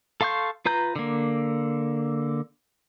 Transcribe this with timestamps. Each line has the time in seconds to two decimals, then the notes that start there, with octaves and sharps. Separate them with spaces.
0.21 A4 F5 C6 C#6 G6
0.66 F4 B4 A#5 G6
0.96 D3 A#3